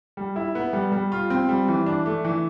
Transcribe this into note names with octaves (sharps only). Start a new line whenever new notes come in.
G3
E4
B3
G3
G3
F4
C4
G3
E3
D4
A3
E3